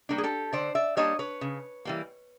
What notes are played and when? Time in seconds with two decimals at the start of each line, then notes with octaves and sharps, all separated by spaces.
0.09 G3 A#3 D4
0.18 G#4
0.24 G4 A4
0.53 D3 C5 D5
0.75 D5 E5
0.97 G3 A#3 D4 C#5 D#5
1.19 B4 C#5
1.41 C#3
1.85 E3 G3 A#3